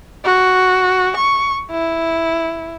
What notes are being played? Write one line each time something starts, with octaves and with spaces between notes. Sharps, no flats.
F#4
C#6
E4